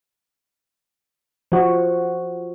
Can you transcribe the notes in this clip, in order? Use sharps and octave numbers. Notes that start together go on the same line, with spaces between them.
F3 F#4